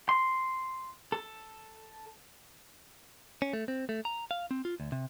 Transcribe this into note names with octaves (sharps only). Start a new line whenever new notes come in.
C6
A4
C#4
A3
C4
A3
A#5
F5
C4
F4
D2
C3